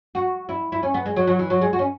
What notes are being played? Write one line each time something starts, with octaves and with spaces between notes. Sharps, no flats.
F#4
E4
E4
C#4
B3
G#3
F#3
F#3
E3
F#3
G#3
F#4
C#4